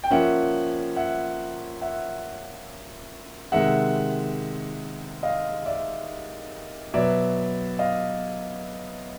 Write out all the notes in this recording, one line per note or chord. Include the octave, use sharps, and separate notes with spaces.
G5
F3 A#3 C#4 E5 F#5
E5 F#5
E5 F#5
C3 D#3 G#3 E5 F#5
D#5 F5
D5 E5
B2 F#3 B3 D5 E5
D#5 F5